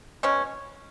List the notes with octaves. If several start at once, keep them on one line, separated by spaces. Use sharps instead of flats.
B2 G#3 C#4